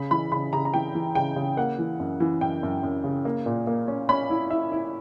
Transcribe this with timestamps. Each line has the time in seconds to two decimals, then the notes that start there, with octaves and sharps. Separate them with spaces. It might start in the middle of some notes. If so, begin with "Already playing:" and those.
Already playing: C#3 B5
0.11 E3 B5
0.32 C#3 B5
0.53 C#3 A#5
0.65 A#5
0.74 E3 G5
0.95 E3
1.15 C#3 G5
1.36 C#3
1.57 A#3 F#5
1.79 E3
1.99 F#2
2.20 E3
2.41 F#2 G5
2.63 F#2
2.83 F#2
3.04 C#3
3.25 A#3
3.46 A#2
3.67 A#3
3.88 C#4
4.09 C#4 B5
4.30 E4
4.50 E4 E5
4.72 E4